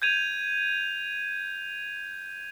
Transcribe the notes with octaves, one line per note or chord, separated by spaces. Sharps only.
G6 G#6 D#7 F7